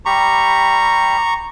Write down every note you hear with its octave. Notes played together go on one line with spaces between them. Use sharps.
G3 G4 A#5 B5 C#6